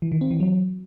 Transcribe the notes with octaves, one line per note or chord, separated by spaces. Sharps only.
E3
D#3
C4
E3
F#3